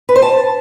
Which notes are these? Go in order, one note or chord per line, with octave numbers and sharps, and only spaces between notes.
B4
C5
A5